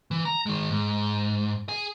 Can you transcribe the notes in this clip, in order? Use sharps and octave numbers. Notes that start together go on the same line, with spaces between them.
E3
A#5
D#3 G#3
G#2
G#4 G#5